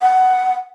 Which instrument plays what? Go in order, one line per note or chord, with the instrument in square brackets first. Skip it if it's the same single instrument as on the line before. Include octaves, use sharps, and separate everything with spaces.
[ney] F#5